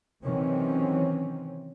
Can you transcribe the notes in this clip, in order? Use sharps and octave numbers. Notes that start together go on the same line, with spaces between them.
C3 D#3 E3 F#3 C4 C#4